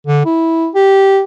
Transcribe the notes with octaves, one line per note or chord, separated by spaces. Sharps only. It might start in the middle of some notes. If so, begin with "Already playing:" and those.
D3
E4
G4